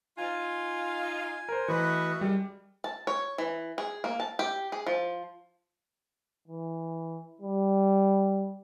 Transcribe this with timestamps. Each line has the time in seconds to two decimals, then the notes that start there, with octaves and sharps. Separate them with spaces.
0.18 D#4 F4 G#5
1.49 A#4 C5
1.68 E3 A3 F#4 B4 D#5
2.21 F#2 G3 G#3
2.84 A5
3.07 C#5
3.38 E3
3.78 G#4
4.04 A#3
4.20 A5
4.39 G4
4.72 G#4
4.87 F3
6.48 E3
7.42 G3